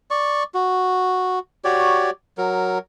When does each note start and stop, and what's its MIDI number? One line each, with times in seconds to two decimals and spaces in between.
0.11 0.43 74
0.11 0.43 85
0.54 1.39 66
1.64 2.10 66
1.64 2.10 67
1.64 2.10 73
1.64 2.10 74
2.38 2.78 54
2.38 2.78 70